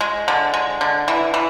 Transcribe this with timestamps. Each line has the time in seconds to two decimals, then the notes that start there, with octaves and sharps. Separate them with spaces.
0.01 G#3
0.28 D3
0.54 G#3
0.81 D3
1.08 E3
1.34 E3